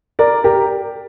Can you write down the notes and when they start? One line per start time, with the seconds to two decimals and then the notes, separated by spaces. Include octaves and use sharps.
0.19 A#4 D5
0.44 G4 A#4